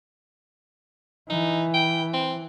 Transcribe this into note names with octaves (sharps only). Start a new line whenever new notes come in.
E3 D#4
G5
C4